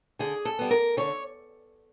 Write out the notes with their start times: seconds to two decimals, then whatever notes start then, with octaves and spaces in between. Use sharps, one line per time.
0.19 D3 G#4
0.45 A4
0.59 G3 B3
0.71 A#4
0.97 D3 C#5